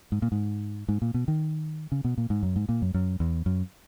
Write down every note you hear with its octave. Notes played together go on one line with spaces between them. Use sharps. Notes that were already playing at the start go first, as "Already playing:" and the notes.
G#2
A#2
G#2
G#2
A#2
B2
D#3
C#3
B2
A#2
G#2
F#2
G#2
A#2
F#2
F#2
E2
F#2